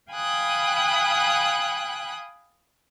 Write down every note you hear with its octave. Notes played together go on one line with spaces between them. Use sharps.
F5 G5 G#5 B5 D#6 F#6